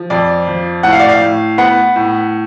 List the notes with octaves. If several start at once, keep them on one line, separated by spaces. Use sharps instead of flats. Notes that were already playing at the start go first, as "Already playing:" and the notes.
Already playing: F3
F2 D5
F3
A2 F#5
F5
D5
F5
A2
B3 F#5
A2